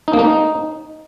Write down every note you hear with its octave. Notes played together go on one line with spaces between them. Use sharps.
D#4
A#3
D#4